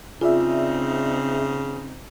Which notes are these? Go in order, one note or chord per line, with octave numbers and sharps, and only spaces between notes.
C#3 C4 D#4 F4 G#4 D5 E5